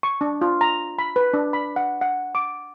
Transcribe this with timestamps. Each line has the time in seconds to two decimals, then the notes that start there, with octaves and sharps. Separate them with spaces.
0.03 C#6
0.21 D4
0.41 F4
0.61 A#5
0.99 B5
1.16 B4
1.33 D4
1.53 B5
1.76 F#5
2.01 F#5
2.35 D6